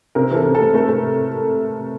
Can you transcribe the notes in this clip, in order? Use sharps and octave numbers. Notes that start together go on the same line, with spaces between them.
C3 A#4
E3 A4
C3
A4
A3
A3 A#4
A3